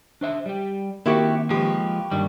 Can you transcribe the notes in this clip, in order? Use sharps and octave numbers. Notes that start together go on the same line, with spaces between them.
D4 C5 E5
G3 G4
D#3 A#3 C4 E4 F#4 G4 C#6
F3 G#3 G4 B4
G2 D#3 G3 D4